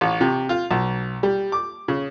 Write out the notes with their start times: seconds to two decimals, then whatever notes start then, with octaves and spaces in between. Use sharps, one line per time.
0.01 A1
0.21 C3
0.49 F4
0.71 B1
1.23 G3
1.52 D6
1.88 C#3